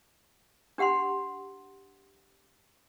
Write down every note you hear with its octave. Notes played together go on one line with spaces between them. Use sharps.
D4 G4 F#5 B5 C6